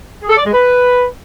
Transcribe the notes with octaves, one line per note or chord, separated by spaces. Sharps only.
G#4
A4
D5
G#3
B4